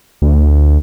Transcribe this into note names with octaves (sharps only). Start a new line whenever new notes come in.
D2